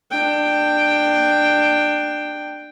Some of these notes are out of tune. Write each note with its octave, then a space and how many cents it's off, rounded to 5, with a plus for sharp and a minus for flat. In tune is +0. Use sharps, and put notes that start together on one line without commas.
D4 +25 G5 +0